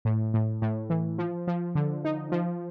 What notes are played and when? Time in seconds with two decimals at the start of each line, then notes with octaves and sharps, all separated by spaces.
0.05 A2
0.34 A2
0.62 A2
0.90 E3
1.18 F3
1.47 F3
1.75 D3
2.05 D#4
2.32 F3